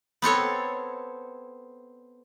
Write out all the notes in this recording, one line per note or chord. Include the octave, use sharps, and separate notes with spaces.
B3 C4 A4 C#5